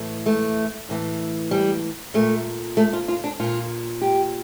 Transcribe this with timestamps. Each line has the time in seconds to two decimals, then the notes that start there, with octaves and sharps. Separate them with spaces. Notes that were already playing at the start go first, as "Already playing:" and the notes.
Already playing: A2 E3
0.26 A3
0.89 A2 E3
1.51 G3
2.14 A#2 A3
2.77 A3
2.93 F4
3.08 F4
3.24 D4
3.40 A#2 F4
4.02 G4